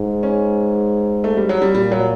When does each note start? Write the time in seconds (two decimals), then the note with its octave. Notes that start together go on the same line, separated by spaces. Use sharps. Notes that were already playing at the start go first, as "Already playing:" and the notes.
Already playing: G#2
0.23 C#4
1.24 A3
1.37 G3
1.49 F#3
1.62 G3
1.74 A#2 G3
1.92 F#3